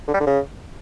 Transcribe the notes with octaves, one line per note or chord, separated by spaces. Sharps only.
D3
G3
D3
C#3